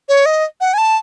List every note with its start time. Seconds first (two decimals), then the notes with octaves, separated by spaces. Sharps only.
0.09 C#5
0.26 D#5
0.61 F#5
0.74 G#5
0.78 A5